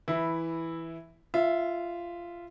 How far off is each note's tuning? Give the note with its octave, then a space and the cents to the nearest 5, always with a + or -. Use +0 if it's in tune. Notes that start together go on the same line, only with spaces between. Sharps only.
E3 +0 E4 -5
F4 -15 E5 +0